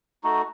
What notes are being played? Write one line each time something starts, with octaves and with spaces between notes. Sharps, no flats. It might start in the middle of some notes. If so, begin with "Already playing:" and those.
A3 D#4 F#4